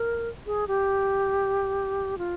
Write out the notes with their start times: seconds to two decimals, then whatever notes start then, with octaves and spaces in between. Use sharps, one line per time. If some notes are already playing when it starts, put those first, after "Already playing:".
Already playing: A#4
0.46 G#4
0.68 G4
2.18 F4